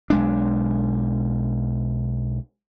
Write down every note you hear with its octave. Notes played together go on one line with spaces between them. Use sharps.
B1 G#3 D4